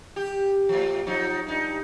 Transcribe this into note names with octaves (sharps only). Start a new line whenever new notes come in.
G4
A2 F3
F3 F#3 D#4
G2 D#4